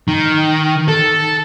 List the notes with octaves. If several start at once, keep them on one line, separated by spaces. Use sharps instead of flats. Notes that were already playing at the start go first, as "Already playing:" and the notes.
D#3
A4